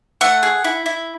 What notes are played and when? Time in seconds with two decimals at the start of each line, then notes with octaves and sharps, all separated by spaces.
0.21 A3 F#5
0.43 G#4
0.64 E4
0.86 E4